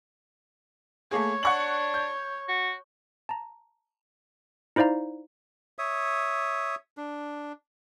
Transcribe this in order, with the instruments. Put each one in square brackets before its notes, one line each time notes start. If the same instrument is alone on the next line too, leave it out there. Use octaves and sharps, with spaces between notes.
[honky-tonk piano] A3 A#3 G#4 [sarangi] C#5
[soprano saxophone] D4 [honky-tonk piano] F#5 C#6 F#7
[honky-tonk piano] G6
[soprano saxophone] F#4
[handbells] A5 A#5
D#4 E4 C5 D5 F5 A#5
[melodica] C#5 E5 D#6
D4